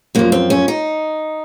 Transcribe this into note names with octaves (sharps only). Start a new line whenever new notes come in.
F#2 F3 A#3
C4
C#4
D#4